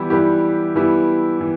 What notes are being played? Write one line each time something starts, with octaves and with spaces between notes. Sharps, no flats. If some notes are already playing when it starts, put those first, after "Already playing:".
Already playing: E3 G3 B3 E4 G4
E3 G3 B3 E4 G4
E3 G3 B3 E4 G4
E3